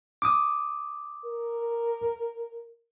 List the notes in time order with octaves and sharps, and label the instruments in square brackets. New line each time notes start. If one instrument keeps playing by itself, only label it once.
[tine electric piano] D6 D#6
[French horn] A#4